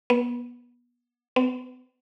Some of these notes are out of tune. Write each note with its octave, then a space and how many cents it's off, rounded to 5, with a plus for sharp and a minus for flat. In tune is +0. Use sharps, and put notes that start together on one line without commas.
B3 -30
B3 +35